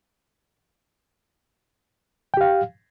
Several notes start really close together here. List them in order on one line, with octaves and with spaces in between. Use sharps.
G5 G4 F5